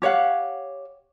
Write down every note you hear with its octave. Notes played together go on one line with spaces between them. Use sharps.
G4 C#5 F5 F#5